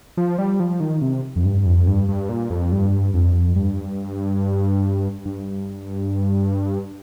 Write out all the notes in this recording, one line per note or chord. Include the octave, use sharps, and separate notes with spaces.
F3
G3
F3
D#3
C3
F2
G2
F2
G2
G2
A#2
F2
G2
F2
G2
G2